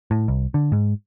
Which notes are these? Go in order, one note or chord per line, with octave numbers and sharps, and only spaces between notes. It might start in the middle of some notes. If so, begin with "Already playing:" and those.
A2
C2
D3
G#2